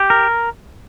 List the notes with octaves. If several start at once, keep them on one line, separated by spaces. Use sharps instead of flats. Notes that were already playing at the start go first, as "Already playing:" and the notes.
Already playing: G4
A#4